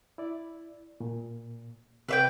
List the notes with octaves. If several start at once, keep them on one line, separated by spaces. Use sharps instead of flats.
E4 D5
A#2
C3 B4 E5 G5